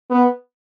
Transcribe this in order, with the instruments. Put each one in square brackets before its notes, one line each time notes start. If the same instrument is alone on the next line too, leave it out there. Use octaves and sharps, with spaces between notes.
[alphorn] B3